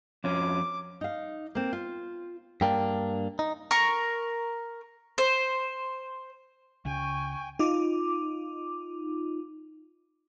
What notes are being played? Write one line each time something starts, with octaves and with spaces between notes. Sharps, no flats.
F2 C#4 D6
D#4 F5
A#3 C4
F4
G2 A#3 D4 G5
D#4
A#4 C#6
C5
C#2 C#3 G5 G#5 C#6
D#4 F4 D6